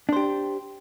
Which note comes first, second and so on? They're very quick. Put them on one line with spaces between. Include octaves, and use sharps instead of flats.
D4 C5 G4